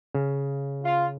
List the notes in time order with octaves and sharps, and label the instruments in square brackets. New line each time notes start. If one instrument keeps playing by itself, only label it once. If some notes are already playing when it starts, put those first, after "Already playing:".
[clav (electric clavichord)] C#3
[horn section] F4